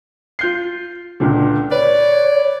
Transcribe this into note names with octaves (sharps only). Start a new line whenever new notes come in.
F4 G6 C7
C#2 A#2 D3
B4 C#5 D5